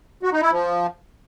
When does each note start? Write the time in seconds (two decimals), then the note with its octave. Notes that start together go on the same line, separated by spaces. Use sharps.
0.23 F#4
0.32 D#4
0.42 E4
0.51 F3